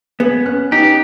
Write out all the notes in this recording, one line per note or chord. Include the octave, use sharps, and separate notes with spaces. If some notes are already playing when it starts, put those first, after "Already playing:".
B3 G#4
C#4 F#6
D#4 G4